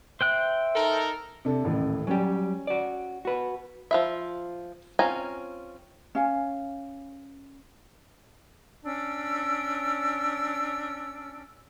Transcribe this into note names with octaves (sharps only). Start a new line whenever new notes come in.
C5 E5 G5 F#6
D#4 A4 A#4
C3 D4 A4
D#1 A1 A2
F#3 G3 C#4 G5
F#4 D5
F#4 B4
F3 F4 E5
C4 C#4 F4 G#5 A#5
C#4 F5 G#5
C#4 D4 E6